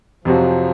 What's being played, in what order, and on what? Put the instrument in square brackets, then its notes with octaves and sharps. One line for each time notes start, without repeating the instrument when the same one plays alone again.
[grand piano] F2 C3 F#3 C4 F#4 [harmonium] F3